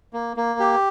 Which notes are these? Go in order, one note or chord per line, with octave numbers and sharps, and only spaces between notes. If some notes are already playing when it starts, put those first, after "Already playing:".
A#3
A#3
G4